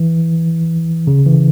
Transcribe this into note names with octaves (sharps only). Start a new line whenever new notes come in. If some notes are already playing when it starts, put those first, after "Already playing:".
Already playing: E3
C#3
E3